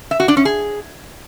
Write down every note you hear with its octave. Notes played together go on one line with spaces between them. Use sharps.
E5
F#4
D4
C#4
G#4